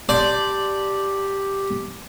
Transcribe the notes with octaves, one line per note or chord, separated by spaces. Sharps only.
G4 D5 A5 C6 G6